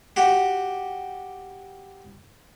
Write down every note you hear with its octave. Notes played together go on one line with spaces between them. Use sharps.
F#4 G4